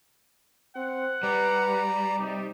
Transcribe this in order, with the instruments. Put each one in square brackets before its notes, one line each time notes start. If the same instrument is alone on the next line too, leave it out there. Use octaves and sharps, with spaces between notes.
[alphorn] C4 [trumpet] F#5
[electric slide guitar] G3 [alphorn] B4 [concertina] D5 A#5
[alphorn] C3 [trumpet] D#4